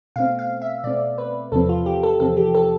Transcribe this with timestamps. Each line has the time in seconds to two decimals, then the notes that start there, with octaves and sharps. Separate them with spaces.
0.16 B2 A3 C4 F5
0.39 F5
0.62 E5
0.84 B2 A3 C4 D5
1.18 B4
1.52 E2 C3 F3 C4 A4
1.69 F4
1.86 G4
2.03 A4
2.20 E2 C3 F3 C4 A4
2.37 G4
2.55 A4